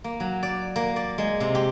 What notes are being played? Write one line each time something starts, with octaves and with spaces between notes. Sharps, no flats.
A#3
F#3
D5
A#3
D5
G#3
C3
G4